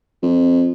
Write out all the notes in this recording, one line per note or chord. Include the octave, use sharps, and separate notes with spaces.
F2